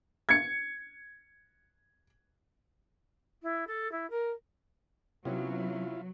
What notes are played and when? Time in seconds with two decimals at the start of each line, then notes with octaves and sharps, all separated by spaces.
0.29 G#6 C#7
3.42 E4
3.67 A4
3.91 E4
4.10 A#4
5.25 C3 F#3 B3 C#4 E4 F4